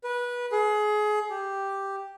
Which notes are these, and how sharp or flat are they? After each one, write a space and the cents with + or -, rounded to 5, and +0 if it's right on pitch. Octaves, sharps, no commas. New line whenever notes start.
B4 -20
G#4 +25
G4 +0